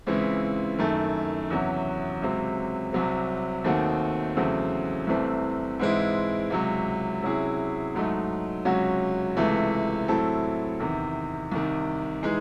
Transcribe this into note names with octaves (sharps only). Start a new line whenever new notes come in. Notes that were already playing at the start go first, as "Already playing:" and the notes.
C#2 C#3 E3 C4 E4
F#2 D#3 A3
E2 C3 F#3 C#4 F#4
C#2 C3 F#3 C4
C2 C3 F#3 C4
D#2 D#3 A3 C4 F#4
E2 C#3 F#3 A3 C4
C2 C3 E3 A3 C4
G#2 E3 G#3 C4 E4
C#2 C3 F#3
C3 F#3 C#4 E4 G#4
G#2 F#3 A3 D#4
C#2 C3 F#3 C#4 F#4
C#2 C3 E3 A3
A2 F#3 C4 E4 A4
E2 C3 D#3
C2 C3 D#3
E3 G#3 D#4 G#4